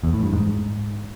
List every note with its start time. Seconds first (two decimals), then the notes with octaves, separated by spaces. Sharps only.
0.03 E2
0.13 A2
0.23 G2
0.33 G#2